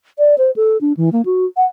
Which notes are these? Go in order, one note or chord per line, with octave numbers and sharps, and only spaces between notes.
D5
C5
A4
D4
E3
A#3
F#4
F#5